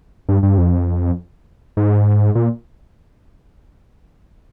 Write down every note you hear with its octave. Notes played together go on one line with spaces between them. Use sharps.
G2
G2
F2
G#2
A#2